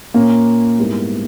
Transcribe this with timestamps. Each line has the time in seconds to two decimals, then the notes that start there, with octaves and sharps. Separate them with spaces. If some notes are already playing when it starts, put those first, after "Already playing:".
0.14 A#2 A#3 C#4
0.79 G#2 G3 B3 E4 A#4